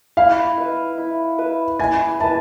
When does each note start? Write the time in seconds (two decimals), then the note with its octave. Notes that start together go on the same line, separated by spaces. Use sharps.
0.17 E4 F5
0.58 B4 E5
0.98 E4
1.38 B4 E5
1.79 E4 G#5
2.20 B4 E5 A5